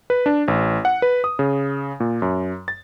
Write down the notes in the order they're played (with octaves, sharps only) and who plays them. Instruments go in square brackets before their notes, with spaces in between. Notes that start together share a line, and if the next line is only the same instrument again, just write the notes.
[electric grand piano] B4
D4
A1
F#5
B4
D#6
C#3
A#2
F#2
A6